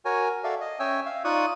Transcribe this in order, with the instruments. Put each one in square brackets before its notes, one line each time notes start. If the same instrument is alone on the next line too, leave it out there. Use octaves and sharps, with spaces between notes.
[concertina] F#4 A#4 C#5 G#5
F#4 A4 D5 E5 F5
D#5
C#4 C#5 E5 G5 G#5 E6
E5 F5
D#4 F4 D5 C#6 D#6 F#6